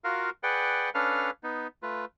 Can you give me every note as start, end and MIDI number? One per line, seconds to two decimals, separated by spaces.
0.04 0.30 65
0.04 0.30 66
0.04 0.30 70
0.04 0.30 77
0.43 0.90 68
0.43 0.90 71
0.43 0.90 74
0.43 0.90 78
0.43 0.90 79
0.95 1.30 61
0.95 1.30 62
0.95 1.30 69
0.95 1.30 71
0.95 1.30 77
0.95 1.30 89
1.43 1.67 59
1.43 1.67 63
1.83 2.05 57
1.83 2.05 65
1.83 2.05 71